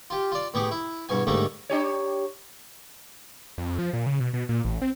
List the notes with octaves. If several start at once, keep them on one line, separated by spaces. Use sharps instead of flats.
F4 G4
F4 D5
A2 B3 G4 G#4 D6
E4
E2 G2 B2 G#5
D2 G#2 G3 A3 A#3 A4
D4 G4 C#5
F2
F3
A#2
C#3
B2
B2
A#2
A1
C4